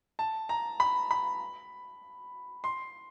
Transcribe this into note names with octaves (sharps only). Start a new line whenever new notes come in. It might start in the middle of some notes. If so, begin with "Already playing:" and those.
A5
A#5
B5
B5
C6